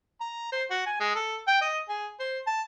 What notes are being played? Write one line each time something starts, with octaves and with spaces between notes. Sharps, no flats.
A#5
C5
F#4
G#5
G#3
A4
G5
D#5
G#4
C5
A5